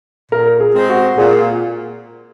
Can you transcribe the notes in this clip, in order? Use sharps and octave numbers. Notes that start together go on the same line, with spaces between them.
A#2 A#4
G#4
G#3 C4
F#4
A#2 G#4